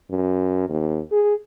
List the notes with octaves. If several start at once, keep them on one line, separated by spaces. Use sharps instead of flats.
F#2
D#2
G#4